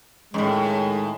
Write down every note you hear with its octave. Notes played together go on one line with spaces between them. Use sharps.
F#2 A2 D#3 G#3